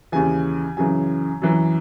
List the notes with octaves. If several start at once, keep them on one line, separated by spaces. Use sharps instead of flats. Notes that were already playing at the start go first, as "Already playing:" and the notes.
D#2 C#3 E3 G#5
F#2 C#3 E3 G#5
F#2 E3